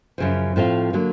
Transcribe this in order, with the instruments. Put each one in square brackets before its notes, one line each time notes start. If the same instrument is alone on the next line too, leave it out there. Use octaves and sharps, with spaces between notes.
[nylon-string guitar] F#2 C#3 F3
A2 F3 A3 C4 F4
D3 F#3 A#3